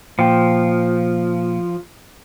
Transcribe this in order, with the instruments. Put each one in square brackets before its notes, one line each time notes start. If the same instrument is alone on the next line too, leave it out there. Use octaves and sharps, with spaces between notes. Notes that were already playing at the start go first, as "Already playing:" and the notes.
[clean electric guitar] A#2 G5 [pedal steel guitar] F3